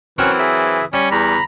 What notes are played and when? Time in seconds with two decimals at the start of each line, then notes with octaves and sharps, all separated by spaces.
0.18 E3 F#3 C4 C#4 A#4 C#6 F#6
0.39 G#4 E5
0.93 G3 C#4
1.11 E2 A#5 B5